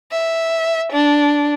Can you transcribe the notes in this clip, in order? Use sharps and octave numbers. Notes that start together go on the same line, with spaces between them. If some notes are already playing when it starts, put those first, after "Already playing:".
E5
D4